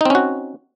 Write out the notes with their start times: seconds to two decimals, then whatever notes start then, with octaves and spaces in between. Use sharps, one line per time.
0.01 D#4
0.05 C4
0.10 C#4
0.15 F#4